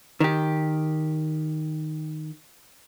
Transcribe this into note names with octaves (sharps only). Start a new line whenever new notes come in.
D#3 G4